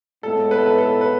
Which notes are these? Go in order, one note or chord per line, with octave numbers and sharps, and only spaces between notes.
A2 G#3 B3 E4 G#4 A4
B4
A4
B4
A4
B4